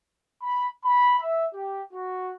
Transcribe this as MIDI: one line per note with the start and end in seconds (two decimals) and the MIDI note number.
0.43 0.68 83
0.85 1.19 83
1.20 1.46 76
1.54 1.83 67
1.93 2.32 66